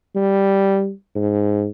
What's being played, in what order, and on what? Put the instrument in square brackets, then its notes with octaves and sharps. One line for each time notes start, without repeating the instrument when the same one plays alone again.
[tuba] G3
G#2